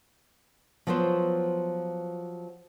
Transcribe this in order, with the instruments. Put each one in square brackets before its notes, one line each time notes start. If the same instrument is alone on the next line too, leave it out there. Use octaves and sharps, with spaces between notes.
[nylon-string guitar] F3 F#3 B3 F4 C5